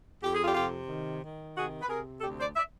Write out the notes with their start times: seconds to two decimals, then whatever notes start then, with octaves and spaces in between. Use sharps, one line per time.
0.23 F2 G4
0.33 G#4
0.44 F4 G4
0.55 C3 F4 G4
0.88 D#3
1.22 D#3
1.56 C3 F#4 G#4
1.82 B4
1.88 C3 G#4 A#4
2.21 D2 G4 A4
2.38 C5 D5
2.55 D5 E5